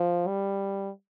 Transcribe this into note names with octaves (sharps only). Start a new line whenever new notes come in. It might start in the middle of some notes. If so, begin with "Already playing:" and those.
Already playing: F3
G3